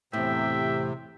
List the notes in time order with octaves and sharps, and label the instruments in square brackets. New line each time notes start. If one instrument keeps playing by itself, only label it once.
[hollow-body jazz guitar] E2 A2 [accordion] C3 [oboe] E5 [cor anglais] G5